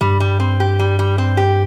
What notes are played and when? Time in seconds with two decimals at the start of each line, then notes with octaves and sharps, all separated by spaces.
0.01 G2 G3
0.20 G3
0.40 C4
0.60 G4
0.79 G3
0.99 G3
1.18 C4
1.37 G4